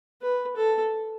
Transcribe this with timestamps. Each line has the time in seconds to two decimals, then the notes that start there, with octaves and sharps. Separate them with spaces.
0.22 B4
0.56 A4